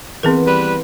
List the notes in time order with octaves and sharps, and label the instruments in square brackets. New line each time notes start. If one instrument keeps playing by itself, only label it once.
[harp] E3 B3 C6 [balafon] C4 G#4 A#4
[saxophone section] G3 B4